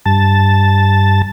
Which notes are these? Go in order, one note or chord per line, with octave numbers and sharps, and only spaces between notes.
G2 A5